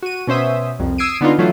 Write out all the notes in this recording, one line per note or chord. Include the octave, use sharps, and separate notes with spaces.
F#4 D#7
B2 C#4 C5 E5 D#6
C2 F2
D#6 E6 G#6 C7 D7 D#7
D3 B3 D4 D#4 F4
E3 F#3 A3 F4